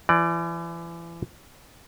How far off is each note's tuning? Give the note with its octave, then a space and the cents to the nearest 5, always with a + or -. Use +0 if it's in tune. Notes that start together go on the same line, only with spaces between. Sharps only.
E3 +35 D5 +15